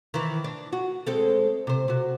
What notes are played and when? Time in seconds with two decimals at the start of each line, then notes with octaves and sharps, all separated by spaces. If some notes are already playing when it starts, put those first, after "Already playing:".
0.14 D#3 E3
0.44 D4
0.73 F#4
1.07 G#3 C4 A4
1.67 C3 C5
1.88 C3 F#4